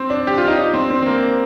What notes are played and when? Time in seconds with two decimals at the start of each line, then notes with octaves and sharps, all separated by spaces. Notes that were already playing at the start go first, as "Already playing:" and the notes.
Already playing: C4
0.10 D4
0.27 G4
0.38 F4
0.48 D#4
0.58 D4
0.74 C4
0.90 C4
1.02 C4
1.06 A#3